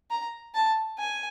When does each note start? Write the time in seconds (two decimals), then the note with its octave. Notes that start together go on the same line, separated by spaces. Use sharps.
0.11 A#5
0.54 A5
0.99 G#5